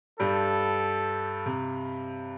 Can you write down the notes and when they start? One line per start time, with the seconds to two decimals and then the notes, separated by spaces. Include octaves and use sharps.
0.19 G2 G3 A4
1.46 C3